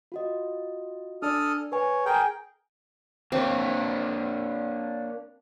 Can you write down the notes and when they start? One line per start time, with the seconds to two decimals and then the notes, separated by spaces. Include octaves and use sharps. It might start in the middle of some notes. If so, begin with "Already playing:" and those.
0.12 F4 F#4 D#5
1.22 D4 A4 D5 D#6 F6
1.72 B4 C#5 G#5
2.06 G#4 A#4 G5
3.32 A#3 C4 D4 C#5